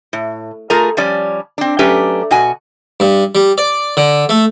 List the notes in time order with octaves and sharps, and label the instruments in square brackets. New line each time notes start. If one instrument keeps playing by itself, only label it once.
[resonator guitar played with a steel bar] A2
A3 F4 G#4 A#4 A#5
F3 G3 C#4 D5
C4 D4
F#3 A3 C#4 D4 G4 B4
B2 F#4 G#5
[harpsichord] G2
G3
D5
D3
A3